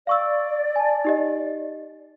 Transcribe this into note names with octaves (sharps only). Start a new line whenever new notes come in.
D5 F5 C#6 E6
G#5 A5
D#4 G4 D#5